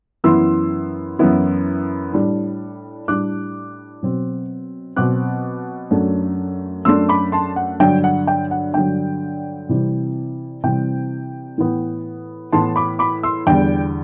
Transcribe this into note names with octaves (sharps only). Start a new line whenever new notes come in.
F#2 E3 B3 E4 C6 E6
F#2 E3 B3 E4
A2 G3 D4
A2 G3 D4 D6 F#6
B2 F#3 C4
B2 F#3 C4 D6 F#6
F#2 F#3 A3 D4
F#2 F#3 A3 D4 C6 E6
B5 D6
A5 C6
F#5
G2 D3 F#3 G5
F#5
G5
F#5
G2 D3 F#3 G5
C3 E3 G3 C4
C3 E3 G3 C4 G5
A2 E3 B3
A2 E3 B3 A5 C6
B5 D6
B5 D6
C6 E6
E2 D3 G3 G5